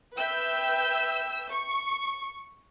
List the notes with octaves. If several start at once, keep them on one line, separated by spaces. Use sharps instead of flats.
B4 E5 G5 E6 G6
C#6